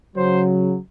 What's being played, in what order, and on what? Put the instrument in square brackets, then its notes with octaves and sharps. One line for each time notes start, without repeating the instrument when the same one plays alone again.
[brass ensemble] C#3 F#3 C5